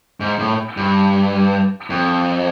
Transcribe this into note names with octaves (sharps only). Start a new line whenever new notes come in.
G#2
A2
G2
F2